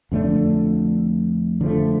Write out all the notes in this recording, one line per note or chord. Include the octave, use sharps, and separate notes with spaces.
F2 D3 A3 D4
D3 F3 A3